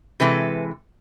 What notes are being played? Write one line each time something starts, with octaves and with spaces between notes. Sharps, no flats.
C3 E3 G#3 A4 B4